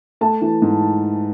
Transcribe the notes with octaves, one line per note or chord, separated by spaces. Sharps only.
A3 A5
E3
G#2